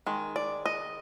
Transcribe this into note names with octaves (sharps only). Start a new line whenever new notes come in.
D#3 G#3
D5
D#5